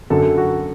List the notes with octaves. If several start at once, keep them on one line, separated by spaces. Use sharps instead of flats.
F#2 D3 F#3 A4
F#4